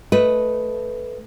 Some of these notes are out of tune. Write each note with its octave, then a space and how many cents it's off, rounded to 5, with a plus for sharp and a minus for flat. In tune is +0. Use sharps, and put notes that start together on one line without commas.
A3 +0 B4 +0 D#5 +5